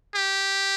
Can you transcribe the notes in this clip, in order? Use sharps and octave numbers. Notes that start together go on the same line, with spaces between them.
G4